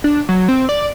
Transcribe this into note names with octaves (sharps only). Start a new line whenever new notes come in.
D4
F#3
C4
D5